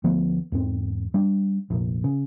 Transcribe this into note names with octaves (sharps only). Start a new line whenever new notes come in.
D2 F3 A3 B3
E2 G#2 C4
G3 D4
F1 A#1
C#3